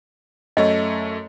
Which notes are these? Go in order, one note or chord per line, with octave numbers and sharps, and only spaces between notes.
F#2 A3 C#5 D#5